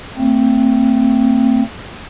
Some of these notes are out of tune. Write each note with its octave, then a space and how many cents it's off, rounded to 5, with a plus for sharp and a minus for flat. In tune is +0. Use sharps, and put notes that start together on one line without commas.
A3 +40 C4 +0